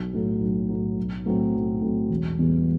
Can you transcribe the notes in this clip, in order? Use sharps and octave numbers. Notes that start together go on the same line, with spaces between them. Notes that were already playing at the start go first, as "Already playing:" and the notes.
Already playing: B1
A2 F#3
B1
A2 F#3
B1
A2 F#3 C4
B1
A2 F#3 C4
E1
E2 B2 G3 B3